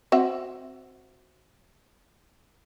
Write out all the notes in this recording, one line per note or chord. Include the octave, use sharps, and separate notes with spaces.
C4 F#4 E5